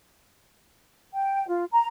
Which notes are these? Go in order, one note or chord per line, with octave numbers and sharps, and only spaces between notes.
G5
F4
A#5